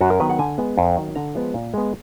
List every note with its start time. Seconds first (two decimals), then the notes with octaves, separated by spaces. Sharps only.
0.01 F#2 F#4
0.10 A#4
0.20 D#3 F#3 B3 B4
0.30 F#5
0.39 D3 G#5
0.58 G#3 B3
0.78 F2
0.97 D#3 F#3
1.15 D3 A#5
1.35 F3 G#3 B3
1.54 A#2
1.74 G#3 B3